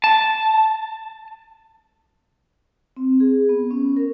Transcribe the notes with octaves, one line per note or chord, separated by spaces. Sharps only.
A5
C4
G#4
B3
C#4
A#4